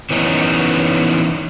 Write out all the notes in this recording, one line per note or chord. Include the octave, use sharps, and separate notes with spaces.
E3 B3 C#4 D#4